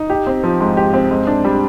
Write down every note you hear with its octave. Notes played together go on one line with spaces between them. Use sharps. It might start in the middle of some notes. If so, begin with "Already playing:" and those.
Already playing: D#4
G4
C4
F3
G#2
G4
C4
G#2
D4
G3